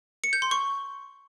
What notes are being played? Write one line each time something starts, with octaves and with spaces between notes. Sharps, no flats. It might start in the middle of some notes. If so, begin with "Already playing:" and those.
C#7
G6
C6
C#6